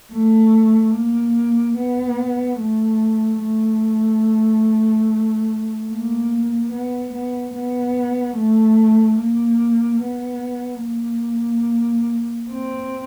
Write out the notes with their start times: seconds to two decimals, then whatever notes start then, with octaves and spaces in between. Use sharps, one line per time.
0.12 A3
0.95 A#3
1.78 B3
2.60 A3
3.43 A3
5.91 A#3
6.73 B3
7.14 B3
7.56 B3
8.37 A3
9.20 A#3
10.03 B3
10.86 A#3
12.51 C4